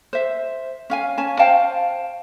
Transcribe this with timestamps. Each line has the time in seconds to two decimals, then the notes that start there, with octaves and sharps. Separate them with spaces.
0.13 C5 E5
0.90 C#4 F5 G#5
1.18 C#4 G#5 A5
1.39 C5 F5 G5 A5